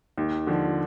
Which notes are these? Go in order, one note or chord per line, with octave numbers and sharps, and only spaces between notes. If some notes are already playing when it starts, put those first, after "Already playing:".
D#2
D3 F3